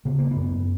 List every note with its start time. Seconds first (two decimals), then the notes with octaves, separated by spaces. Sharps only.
0.05 C#3 B3
0.18 A#3
0.31 B3
0.36 F#2